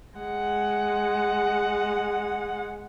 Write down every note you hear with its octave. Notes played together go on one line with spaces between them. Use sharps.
G#3 F#5